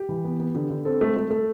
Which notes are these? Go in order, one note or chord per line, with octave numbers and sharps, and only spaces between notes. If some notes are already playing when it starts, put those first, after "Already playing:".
Already playing: G4
E3
B3
B3
D3 G4
D3
C4 A4
A3
A3
A3